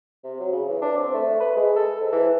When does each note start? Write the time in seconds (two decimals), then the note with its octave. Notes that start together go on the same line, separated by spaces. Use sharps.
0.24 C3
0.40 F#3
0.53 C#3
0.69 E3
0.82 D4
0.97 C4
1.14 A3
1.40 B4
1.56 G#3
1.76 A4
2.01 G#2
2.12 E3